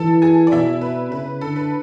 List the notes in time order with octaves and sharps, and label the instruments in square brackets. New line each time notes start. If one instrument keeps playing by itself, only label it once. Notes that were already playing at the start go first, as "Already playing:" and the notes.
Already playing: [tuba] E3 [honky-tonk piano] A4 A5
[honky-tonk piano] G#4 G#5
D5
[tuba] B2 [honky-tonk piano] E4 E5
[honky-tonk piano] B4
[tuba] C#3 [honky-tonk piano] B4
[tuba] D3 [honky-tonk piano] A4
[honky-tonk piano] B4